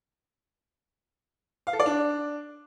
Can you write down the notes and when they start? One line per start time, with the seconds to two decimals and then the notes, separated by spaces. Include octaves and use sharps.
1.67 F5
1.73 A4
1.79 D5
1.86 D4